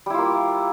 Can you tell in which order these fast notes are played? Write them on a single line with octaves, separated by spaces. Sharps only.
G3 E4 F4 A#3